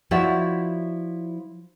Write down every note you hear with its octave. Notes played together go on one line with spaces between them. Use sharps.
F3 E4 F#4 C#5 D5 E5